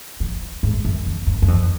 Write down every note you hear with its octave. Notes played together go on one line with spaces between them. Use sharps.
F3
G#2
F#2
F2
F#2
F#2
F2